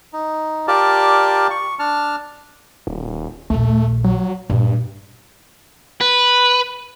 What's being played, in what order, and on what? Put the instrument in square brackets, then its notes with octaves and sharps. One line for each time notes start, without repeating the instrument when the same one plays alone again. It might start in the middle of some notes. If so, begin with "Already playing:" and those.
[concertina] D#4
F4 G4 A#4 D5 A5
C#6
D4 A5 F6
[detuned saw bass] D#1
[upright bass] A#1 D#2 [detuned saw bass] A3
[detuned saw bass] F#3
[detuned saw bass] G2 [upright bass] A#2
[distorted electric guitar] B4